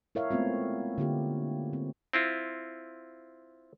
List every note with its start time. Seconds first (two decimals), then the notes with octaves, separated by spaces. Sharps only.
0.15 E4 A#4 C#5 E5 F5
0.31 G#3 A3 B3 C4 F4
0.98 D3 A#3 F4 G4
1.73 C4
2.13 C4 E4 F4